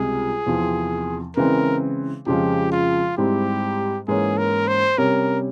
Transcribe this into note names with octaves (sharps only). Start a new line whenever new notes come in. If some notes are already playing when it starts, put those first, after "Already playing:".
Already playing: C#2 C3 G3 G#4
E2 C3 F3 C4
C#3 E3 G#3 C4 A#4
F2 C#3 F3 G#3 G4
F4
G#2 G3 C4 E4 G4
G#2 E3 A#3 C#4 G#4
A#4
C5
C3 G3 C#4 A#4